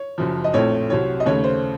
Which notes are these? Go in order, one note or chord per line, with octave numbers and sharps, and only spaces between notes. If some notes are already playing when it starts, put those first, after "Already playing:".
Already playing: C#5
F#1 F#2 F3
D#5
A#1 A2 A3 C4 C#5
C2 C3 F#3 C4 C#5
D#5
D#2 C#3 A3 C#5
C5